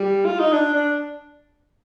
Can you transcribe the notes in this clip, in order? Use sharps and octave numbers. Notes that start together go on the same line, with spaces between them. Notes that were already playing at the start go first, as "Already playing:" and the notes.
Already playing: G3
F4
D#4
D4
D4